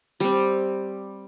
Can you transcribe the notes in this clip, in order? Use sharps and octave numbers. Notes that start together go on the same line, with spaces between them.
G3 C4